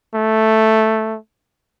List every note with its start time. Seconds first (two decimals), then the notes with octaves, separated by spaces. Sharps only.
0.14 A3